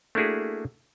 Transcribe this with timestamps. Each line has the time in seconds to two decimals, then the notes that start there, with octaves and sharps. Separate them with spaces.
0.15 A3 A#3 D4 E4 F#4 G#4